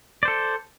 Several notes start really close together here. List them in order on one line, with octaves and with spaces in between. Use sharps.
D5 C5 A4